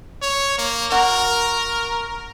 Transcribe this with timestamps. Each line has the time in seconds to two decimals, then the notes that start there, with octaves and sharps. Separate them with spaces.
0.22 C#5
0.58 A#3
0.92 F#4 A#4